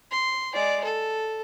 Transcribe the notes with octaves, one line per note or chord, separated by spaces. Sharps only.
C6
G#3 D5
A4